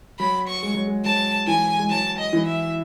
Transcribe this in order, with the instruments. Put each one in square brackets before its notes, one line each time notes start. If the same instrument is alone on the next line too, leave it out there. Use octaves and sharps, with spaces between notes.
[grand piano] F#3 [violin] B5
[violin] C#6
[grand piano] G#3
F#3
G#3
[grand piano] F#3 [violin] A5
[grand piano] E3 [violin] G#5
[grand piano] G#3
[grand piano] F#3 [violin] A5
[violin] D#5
[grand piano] E3
[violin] E5